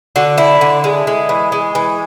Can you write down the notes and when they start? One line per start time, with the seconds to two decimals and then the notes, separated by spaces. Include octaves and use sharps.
0.16 D3 F#4
0.38 D4 E4
0.61 D3
0.84 G#3
1.07 G#3
1.29 E3
1.52 G#3
1.75 E3